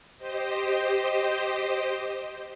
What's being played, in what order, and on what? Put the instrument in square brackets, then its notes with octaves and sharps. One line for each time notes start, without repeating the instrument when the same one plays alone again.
[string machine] G4 C5 D#5